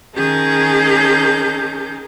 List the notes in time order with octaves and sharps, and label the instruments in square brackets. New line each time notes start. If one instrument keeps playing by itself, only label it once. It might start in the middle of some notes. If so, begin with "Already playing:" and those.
[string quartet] D#3 C#4 G#4 A#4 A5 G6